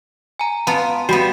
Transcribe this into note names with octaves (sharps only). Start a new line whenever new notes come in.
G#5 A#5
B3 F4 A5 A#5
G3 B3 F#4 B5